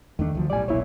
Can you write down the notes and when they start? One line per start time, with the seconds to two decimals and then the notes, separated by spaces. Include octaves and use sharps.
0.19 E2 D#3 A3 D4
0.35 D2 F3 F#3
0.50 B1 A2 G3 D5 G#5
0.68 E1 B1 A#2 E4 C#5